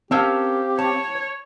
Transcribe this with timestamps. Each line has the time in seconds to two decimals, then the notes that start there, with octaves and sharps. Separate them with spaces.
0.11 C4 C#4 G4 A#4 F5 A5
0.79 C#5 A5